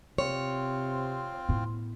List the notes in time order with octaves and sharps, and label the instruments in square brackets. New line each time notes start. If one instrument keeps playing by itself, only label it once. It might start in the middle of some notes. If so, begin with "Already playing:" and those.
[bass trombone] C3 [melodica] C4 F4 [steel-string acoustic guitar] C#5
[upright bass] A2 B3